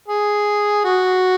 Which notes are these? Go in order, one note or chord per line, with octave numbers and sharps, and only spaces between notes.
G#4
F#4